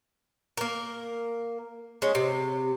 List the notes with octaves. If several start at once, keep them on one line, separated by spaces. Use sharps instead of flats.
A#3 A#4
G#3 C#4
C3